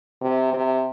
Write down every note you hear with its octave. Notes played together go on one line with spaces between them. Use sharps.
C3
C3